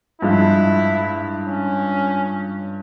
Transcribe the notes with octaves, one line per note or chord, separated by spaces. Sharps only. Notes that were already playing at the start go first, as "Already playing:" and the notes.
G2 F3 G#3 E4
C#4